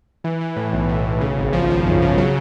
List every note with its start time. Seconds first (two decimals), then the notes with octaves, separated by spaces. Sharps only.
0.24 E3
0.41 E3
0.56 A2
0.73 B1
0.89 A2
1.05 B1
1.21 C#3
1.37 G#1
1.53 F3
1.70 F3
1.86 F#2
2.02 C#3
2.18 F#3